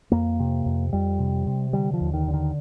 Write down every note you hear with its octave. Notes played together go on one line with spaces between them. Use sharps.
F2 A#3
C3
F2
F2 G3
C3
C3
D3 G3
F3
D#2
D#3
D3
D#3